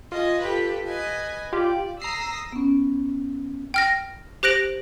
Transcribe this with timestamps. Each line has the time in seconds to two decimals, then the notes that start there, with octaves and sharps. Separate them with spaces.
0.12 F4 D#5 G#5
0.42 G4 A4 B4
0.86 B4 D#5 G#5
1.53 F4 G4 D5
2.02 A#5 D#6 E6 A#6 C7
2.52 B3 C#4
3.74 G5 F6 A#6
4.43 G4 C5 F#6 A#6 D7 F#7